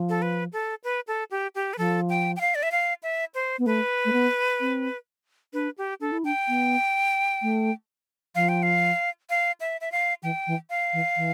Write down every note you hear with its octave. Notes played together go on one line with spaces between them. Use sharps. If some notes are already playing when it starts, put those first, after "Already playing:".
Already playing: F3
A4
B4
A4
B4
A4
G4
G4
B4
F3 A4
G5
G5
F5
D5
E5
F5
E5
C5
B3
A3 B4
A3
B3
C4
D4 B4
G4
D4 A4
E4
D4 G5
B3
A3
F3 F5
G5
F5
F5
E5
E5
F5
E3 G5
E3
F5
E3
E3